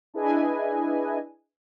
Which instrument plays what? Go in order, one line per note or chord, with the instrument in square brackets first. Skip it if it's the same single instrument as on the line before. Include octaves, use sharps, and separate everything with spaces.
[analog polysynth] D4 E4 G#4 B4 D#5 G#5